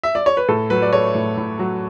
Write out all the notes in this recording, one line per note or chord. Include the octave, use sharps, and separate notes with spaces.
E5
D5
C#5
B4
A2 A4
F#3 B4
D5
A3 C#5
A2
A2
F#3